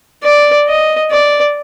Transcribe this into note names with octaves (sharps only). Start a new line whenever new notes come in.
D5
D#5
D5